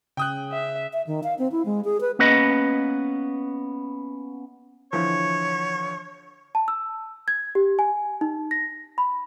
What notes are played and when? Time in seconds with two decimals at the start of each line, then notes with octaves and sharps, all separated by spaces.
0.17 C#3 G5 D#6 F#6
0.52 E5
0.93 E5
1.07 D#3
1.23 F5
1.39 C4
1.52 E4
1.66 G#3
1.85 G#4
2.01 B4
2.19 A#3 B3 C#4 B4 D#5 B5
4.93 D3 E3 F3 C#5
6.55 A5
6.68 E6
7.28 G#6
7.55 G4
7.79 G#5
8.21 D#4
8.51 A#6
8.98 B5